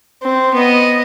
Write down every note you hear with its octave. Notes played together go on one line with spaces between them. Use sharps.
C4
B3 D#5